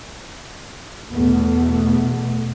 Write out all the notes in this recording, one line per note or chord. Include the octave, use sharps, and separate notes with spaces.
E2 B2 A3 B3